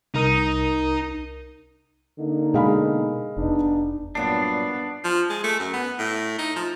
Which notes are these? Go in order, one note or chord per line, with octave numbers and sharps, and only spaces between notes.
C2 D#4 A#4 D#6
D3 A#3 D#4
B2 G#3 F5 B5
F1 B3 D4 D#4
G2 A#2 F#3 B3 D4 C7
F3
G#3
A3
F#2
B3
A2
D#4
F3